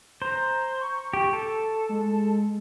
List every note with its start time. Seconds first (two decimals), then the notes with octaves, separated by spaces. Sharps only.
0.22 C5 A#5
0.81 C#6
1.14 G4
1.33 A4
1.89 G#3